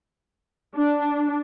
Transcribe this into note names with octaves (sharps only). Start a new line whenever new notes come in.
D4